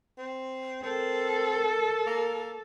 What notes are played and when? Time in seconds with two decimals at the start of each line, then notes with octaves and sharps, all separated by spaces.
0.18 C4
0.84 C4 A4 A#4
2.07 A#3